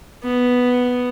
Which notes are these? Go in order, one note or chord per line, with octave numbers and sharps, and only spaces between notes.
B3